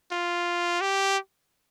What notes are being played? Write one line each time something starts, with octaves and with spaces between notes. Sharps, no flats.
F4
G4